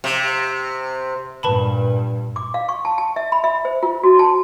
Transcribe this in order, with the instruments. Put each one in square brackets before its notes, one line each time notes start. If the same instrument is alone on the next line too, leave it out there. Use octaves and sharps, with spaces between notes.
[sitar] C3
[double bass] G2 A#2 [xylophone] B4 A5 B5
[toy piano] D6
F5
C#6
A5
A5
E5
B5
E5
C5
F4
F#4
A5